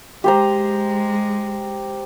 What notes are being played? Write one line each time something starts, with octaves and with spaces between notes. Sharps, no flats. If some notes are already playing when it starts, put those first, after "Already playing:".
G#3 G4 C5 A#5